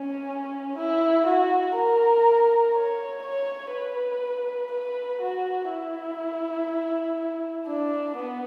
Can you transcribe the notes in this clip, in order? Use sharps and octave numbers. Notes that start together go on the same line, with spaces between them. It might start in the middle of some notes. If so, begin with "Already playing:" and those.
Already playing: C#4
E4
F#4
A#4
C#5
C#5
B4
B4
F#4
E4
D4
B3